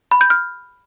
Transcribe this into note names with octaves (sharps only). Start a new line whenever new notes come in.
B5
G6
F6